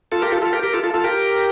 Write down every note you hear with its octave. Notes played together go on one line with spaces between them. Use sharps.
F4 A4
G4 A#4
F4 A4
F4 A4
G4 A#4
G4 A#4
F4 A4
F4 A4
F4 A4
G4 A#4